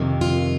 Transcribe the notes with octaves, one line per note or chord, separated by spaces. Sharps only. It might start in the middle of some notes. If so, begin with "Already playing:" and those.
Already playing: F2 C3 D#3 A#3
F4